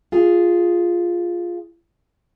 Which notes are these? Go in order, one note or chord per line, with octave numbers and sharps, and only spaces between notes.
F4 G#4